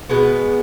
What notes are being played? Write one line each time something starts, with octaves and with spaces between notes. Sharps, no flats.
B2 G#3 B3